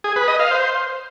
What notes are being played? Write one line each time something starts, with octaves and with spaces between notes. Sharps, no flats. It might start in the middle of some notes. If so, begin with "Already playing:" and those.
G#4
B4
D#5
F5
C5